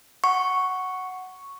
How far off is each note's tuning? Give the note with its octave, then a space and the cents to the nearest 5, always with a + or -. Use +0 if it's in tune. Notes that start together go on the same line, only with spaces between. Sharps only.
F#5 +5 C#6 +0